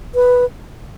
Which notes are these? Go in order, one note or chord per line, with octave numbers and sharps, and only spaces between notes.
B4